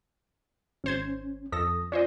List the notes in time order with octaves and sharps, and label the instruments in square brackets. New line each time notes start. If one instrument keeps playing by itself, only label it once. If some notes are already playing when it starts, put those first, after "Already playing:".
[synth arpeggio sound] G#1 C5 G#6 [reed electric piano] C#4
[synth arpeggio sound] F2 A4 A#6 [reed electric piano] D#6
[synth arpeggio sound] C#4 C5 D#5 [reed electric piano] F4 D5